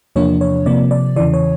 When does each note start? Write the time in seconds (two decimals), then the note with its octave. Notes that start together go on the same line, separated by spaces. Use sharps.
0.16 E2 C3 F3 A#3 D4 C#5
0.41 C#5
0.66 C3 F3 A#3 D5
0.91 D5
1.16 E2 C#3 E3 D5
1.34 C#5